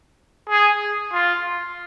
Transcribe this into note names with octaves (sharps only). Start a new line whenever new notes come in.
G#4
F4